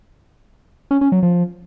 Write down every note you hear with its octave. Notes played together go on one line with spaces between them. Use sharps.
C#4
C#4
F#3
F3